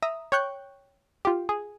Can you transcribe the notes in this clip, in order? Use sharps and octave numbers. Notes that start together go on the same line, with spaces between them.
E5 A#5 D#6
C#5 G5 C#6 F#6 G6
F4 G4
G#4